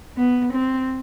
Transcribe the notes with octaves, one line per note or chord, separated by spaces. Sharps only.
B3
C4